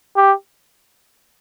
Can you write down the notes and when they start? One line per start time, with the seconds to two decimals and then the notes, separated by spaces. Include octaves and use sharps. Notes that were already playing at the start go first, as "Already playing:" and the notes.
0.16 G4